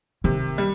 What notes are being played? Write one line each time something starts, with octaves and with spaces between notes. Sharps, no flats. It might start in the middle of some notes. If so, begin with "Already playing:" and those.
C3 D#3
G3